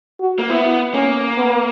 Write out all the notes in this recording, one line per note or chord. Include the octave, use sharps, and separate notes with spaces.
F#4
A#3
B3 E4
A#3 C#4
B3